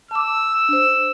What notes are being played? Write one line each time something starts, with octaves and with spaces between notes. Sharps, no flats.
A5 D6 E6
D4 C5